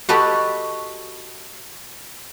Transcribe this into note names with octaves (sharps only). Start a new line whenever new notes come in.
F#4 G4 A4 B4 D#5 F#5